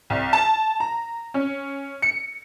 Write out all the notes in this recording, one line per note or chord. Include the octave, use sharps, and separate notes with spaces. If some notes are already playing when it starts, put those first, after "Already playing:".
C2
A5
A#5
C#4
C#7